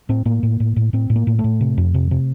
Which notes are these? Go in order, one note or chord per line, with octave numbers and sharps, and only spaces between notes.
A2 C4
A2 A#3
A2
A2
A2
A2 C4
A2
A#3
A2
A3
A2
C3
F2
C3
C3